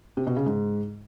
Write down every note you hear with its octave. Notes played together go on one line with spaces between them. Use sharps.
C3
B2
C#3
G#2